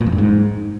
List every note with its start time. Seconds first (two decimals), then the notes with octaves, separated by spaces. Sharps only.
0.01 A#2
0.06 F2
0.12 G2
0.18 G#2